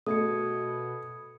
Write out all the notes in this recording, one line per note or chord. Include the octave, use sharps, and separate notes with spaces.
B2 A3 D#6 G#6 C#7